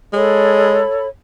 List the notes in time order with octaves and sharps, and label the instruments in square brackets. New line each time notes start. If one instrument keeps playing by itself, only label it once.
[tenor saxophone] G#3 [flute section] A4 C#5 B5